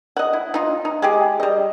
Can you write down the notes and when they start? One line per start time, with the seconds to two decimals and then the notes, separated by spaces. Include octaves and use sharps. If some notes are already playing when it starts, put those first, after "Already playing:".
0.17 D#5 F#5
0.33 E4
0.54 D#4 F4
0.85 D#4
1.02 G#3 G4 G#4
1.40 G3 D#5